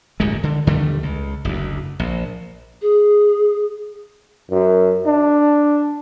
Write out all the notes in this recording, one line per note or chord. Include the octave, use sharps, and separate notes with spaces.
D1 G1 A#2 G#3
D3
D#2 D3 G3 A3
C#2
F#1 D2
A#1
G#4
F#2
D4